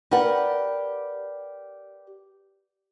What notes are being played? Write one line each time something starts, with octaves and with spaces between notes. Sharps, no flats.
G4 A#4 B4 D5 F#5